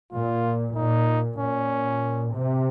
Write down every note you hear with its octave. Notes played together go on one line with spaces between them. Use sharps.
A#2 F4
A#2 D#4
A#2 C#4
C3